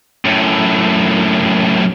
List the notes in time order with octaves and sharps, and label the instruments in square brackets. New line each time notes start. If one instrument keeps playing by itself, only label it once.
[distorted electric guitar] F#2 A2